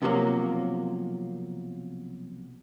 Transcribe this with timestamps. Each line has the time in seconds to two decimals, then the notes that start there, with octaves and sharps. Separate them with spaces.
0.02 B1 C3 F3 F#3 A#3